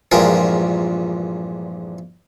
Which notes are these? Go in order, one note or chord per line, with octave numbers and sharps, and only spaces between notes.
A#1 E2 G2 G#3 F4 A#4